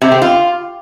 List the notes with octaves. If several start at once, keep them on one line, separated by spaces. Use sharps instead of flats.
C3
C4
F4